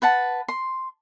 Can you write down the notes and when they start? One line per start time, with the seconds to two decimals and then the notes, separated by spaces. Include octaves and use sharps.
0.02 B4 F#5 A5
0.48 C6